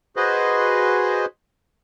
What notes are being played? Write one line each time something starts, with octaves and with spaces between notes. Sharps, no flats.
F#4 G#4 B4 C5 D#5